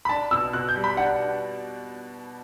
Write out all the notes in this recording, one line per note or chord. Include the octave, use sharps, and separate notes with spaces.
B5
D4 A5
B2 E6
B2 F#6
G6
G3
B5
D4 F#5